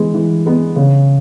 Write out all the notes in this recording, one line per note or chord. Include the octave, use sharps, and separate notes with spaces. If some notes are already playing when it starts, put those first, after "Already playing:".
Already playing: E3 G#3 B3
E3
G#3 B3
C#3